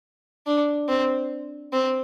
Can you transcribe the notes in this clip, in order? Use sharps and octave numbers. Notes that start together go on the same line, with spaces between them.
D4
C4
C4